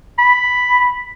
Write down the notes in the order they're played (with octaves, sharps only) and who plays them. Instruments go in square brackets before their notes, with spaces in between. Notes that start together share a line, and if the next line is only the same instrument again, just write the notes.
[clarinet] B5